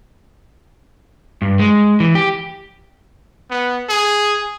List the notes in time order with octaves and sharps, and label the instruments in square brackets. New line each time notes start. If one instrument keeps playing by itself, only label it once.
[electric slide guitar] G2
G#3
E3
G4
[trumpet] B3
G#4